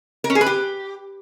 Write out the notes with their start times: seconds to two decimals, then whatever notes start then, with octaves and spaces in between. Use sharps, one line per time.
0.24 A#4
0.30 C#4
0.35 G#4
0.41 B4
0.46 G4